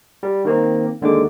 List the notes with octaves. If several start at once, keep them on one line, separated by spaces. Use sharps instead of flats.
G3
D#3 A#3 C4
D#2 D3 D#3 G#3 A3 D6